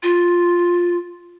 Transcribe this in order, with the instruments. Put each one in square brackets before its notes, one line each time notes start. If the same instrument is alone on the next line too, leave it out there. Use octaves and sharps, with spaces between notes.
[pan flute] F4